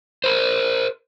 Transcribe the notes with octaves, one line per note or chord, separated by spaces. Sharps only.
A#4 C5